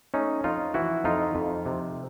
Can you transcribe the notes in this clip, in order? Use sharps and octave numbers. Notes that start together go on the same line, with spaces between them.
A3 C#4 D#4
F2 D#4 F4
E3 E4 F#4
F2 D#4 F4
F2
C3